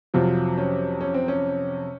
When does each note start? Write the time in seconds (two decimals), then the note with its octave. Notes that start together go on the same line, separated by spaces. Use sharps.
0.14 F2 C3 F#3 F4
0.58 C#4
1.01 C#4
1.14 C4
1.28 C#4